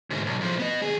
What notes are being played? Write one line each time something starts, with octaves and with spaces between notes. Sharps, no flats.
D2 G#2
B1
A2 F3
B3 D#5
D#2 G#4